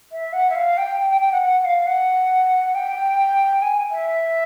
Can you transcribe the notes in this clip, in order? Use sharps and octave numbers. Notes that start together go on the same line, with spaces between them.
E5
F#5
E5
F5
G5
G5
G5
G5
F#5
F#5
F5
F#5
G5
G#5
E5